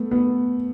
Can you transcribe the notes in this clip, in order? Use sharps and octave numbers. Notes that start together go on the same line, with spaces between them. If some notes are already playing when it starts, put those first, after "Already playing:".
Already playing: A3 B3
B3